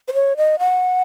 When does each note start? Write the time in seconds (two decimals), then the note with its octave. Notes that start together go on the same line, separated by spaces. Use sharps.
0.08 C5
0.14 C#5
0.37 D#5
0.59 F#5